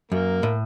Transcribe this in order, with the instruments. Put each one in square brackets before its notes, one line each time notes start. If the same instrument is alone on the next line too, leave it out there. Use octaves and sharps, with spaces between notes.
[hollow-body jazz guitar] F#2 [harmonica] A#3
[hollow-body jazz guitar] A2